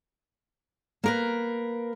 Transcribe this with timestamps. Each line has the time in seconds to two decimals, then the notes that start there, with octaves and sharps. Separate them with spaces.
1.04 A#3 A#4 B4